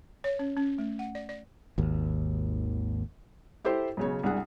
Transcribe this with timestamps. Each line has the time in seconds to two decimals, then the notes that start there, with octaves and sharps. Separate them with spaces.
0.24 C#5
0.39 C#4
0.56 C#4
0.78 A3
0.99 F#5
1.15 D5
1.29 D5
1.78 G#1 D#2
3.65 E4 G4 A4 C5
3.97 B1 C#3 C#5
4.23 C2 D4 G#4 F#5